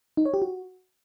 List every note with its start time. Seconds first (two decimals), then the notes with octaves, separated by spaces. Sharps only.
0.17 D#4
0.25 C#5
0.34 G4
0.42 F#4